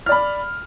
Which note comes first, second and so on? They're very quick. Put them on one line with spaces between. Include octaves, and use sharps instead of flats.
F6 D5 B5